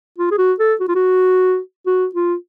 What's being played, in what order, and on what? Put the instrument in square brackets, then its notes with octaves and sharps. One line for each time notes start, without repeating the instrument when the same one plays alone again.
[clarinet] F4
G#4
F#4
A4
F#4
F4
F#4
F#4
F4